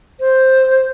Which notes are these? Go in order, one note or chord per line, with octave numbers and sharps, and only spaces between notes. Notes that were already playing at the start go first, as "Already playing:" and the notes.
C5